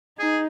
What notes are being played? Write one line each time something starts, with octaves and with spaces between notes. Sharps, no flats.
D#4 G#4